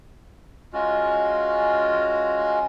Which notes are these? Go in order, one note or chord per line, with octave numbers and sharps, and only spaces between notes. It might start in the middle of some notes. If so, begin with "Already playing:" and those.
G#3 C#4 F4 F#4